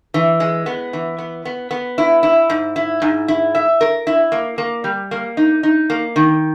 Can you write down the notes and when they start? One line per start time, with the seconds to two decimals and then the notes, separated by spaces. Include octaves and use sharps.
0.14 E3
0.40 G#3
0.66 B3
0.93 E3
1.18 B3
1.45 B3
1.71 B3
1.98 E4
2.23 E4
2.50 G#2
2.76 E4
3.02 G#2
3.28 E4
3.55 E5
3.81 A#4
4.07 E4
4.32 A#3
4.58 A#3
4.84 G3
5.11 A#3
5.37 D#4
5.63 D#4
5.90 A#3
6.16 D#3